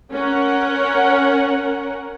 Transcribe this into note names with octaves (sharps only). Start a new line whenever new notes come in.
C#4 A#4 F#5